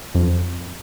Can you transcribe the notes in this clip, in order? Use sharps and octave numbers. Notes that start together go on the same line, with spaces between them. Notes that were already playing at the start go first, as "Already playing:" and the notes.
F2